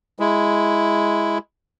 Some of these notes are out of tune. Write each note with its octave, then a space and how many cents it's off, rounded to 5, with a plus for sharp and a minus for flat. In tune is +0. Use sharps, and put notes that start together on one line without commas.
G#3 +0 E4 +0